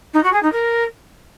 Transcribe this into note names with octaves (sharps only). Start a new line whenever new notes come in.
D#4
F#4
G#4
D#4
A#4